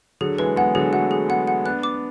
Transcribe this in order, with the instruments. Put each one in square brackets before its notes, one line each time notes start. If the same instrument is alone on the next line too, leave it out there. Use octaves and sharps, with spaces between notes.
[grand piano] D3 F#3 [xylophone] G#4
[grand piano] E3 G#3 [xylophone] B4
[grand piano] G#3 B3 [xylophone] F#5
[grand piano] D3 F#3 [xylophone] G#4
[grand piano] F#3 A3 [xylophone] F#5
[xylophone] G#4
[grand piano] G#3 B3 [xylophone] F#5
[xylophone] F#5
[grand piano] B3 D4 [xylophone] F#6
[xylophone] D6